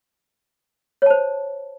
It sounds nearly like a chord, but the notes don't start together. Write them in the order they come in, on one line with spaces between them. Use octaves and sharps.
C#5 A5 C5